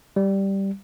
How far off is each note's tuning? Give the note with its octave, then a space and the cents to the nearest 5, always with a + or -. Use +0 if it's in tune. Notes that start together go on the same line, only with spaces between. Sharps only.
G3 -5